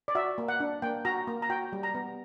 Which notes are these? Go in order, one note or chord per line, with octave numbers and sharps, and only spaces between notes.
D5
F#4 E5
A#3
F#5
D4
A#3 G5
F#4 A#5
A#3
A#5
F#4 G5
G3
A#5
B3